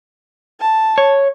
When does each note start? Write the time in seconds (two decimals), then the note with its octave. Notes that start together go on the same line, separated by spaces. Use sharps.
0.61 A5
0.98 C#5